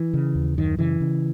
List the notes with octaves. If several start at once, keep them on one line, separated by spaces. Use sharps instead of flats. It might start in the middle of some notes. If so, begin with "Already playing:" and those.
Already playing: E3
C#3
D#2
F#2 D#3
C#3 E3
C#3